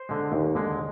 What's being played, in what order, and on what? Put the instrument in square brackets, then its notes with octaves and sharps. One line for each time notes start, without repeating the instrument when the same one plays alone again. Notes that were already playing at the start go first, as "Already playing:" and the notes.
Already playing: [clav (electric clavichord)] C5
D3 G#3
D#2
D3 G#3